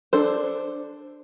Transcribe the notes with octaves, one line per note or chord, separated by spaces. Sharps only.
D4 A4 C5